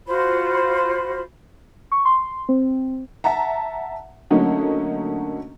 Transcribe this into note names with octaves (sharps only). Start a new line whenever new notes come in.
F4 F#4 C5 B5
C#6
C6
C4
E5 F#5 A5 A#5
D3 F#3 A3 A#3 C#4 D#4